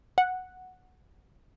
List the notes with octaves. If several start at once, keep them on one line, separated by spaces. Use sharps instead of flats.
F#5